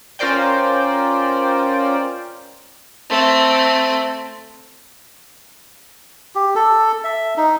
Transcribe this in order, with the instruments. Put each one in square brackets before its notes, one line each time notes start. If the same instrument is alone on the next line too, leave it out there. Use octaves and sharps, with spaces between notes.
[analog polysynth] C#4 F4 A#4 C5 D5 G5
[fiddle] A3 C4
[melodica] G4
A4
E5
D#4